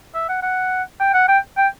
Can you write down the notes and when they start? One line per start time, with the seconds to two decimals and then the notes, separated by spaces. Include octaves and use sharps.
0.15 E5
0.29 F#5
0.43 F#5
1.00 G5
1.14 F#5
1.28 G5
1.57 G5